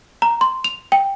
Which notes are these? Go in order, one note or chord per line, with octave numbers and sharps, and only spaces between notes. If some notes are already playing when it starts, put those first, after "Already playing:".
A#5
C6
F7
G5